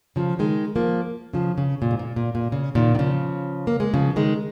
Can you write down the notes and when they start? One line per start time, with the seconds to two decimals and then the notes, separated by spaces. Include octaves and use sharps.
0.16 C#3 F3
0.39 D#3 G#3
0.76 F3 A#3
1.33 C#3 F3
1.58 C#3
1.82 A#2
1.91 G#2
1.99 A#2
2.16 A#2
2.35 A#2
2.52 C#3
2.75 A#2 D#3
2.95 D#3
2.99 C#3 F3
3.67 A#3
3.80 G#3
3.94 C#3 F3
4.16 D#3 G#3